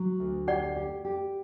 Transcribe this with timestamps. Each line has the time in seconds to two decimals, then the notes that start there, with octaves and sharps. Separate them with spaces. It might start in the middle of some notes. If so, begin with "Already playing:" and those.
Already playing: F#3
0.20 D2
0.47 G4 D5 F#5
0.76 G4
1.05 G4